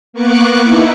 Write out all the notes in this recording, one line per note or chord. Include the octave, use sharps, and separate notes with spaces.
A#3 B3 C#6 D6 F#6 C#7
D#4 E4